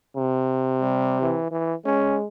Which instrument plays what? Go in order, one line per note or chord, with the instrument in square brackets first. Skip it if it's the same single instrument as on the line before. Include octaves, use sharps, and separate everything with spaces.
[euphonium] C3
[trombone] G3
E3
E3
[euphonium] G#3 [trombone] C#4